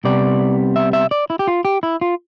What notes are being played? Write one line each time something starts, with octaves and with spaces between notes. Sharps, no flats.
C2 C3 G3 B3 D5
E5
E5
D5
E4
G4
F4
G4
E4
F4